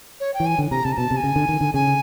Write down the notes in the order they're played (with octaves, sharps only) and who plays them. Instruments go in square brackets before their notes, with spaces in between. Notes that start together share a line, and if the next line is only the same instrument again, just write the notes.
[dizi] C#5
G5
[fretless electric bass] E3
[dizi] G#5
[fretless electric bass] D3
[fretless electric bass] C3 [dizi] A#5
[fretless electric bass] C3 [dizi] A5
[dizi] A#5
[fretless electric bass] B2 [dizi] A5
[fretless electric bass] C3
[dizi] G#5
[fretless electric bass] C#3
D3
D#3
D3
[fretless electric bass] C#3 [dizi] G#5